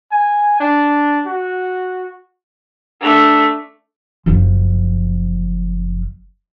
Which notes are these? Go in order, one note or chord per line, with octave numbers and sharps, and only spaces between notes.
G#5
D4
F#4
A3 D4
F#1 F3